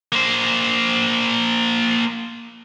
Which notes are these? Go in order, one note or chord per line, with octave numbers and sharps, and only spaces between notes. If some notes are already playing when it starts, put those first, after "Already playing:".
A#3 C5